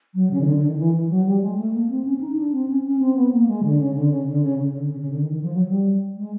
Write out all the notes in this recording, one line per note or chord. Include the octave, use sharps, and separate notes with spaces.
F#3
C#3
D#3
D3
D3
D#3
E3
E3
F#3
G3
G#3
A3
A#3
C4
C#4
D#4
D4
C4
C#4
C#4
C4
B3
A#3
G#3
D3
C#3
D3
C#3
D3
C#3
C#3
D3
C#3
C#3
D3
D#3
D#3
F3
F#3
G3
G#3